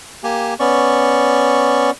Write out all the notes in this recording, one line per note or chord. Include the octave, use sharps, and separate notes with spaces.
A#3 G4 G#5
B3 C#4 D5 C#6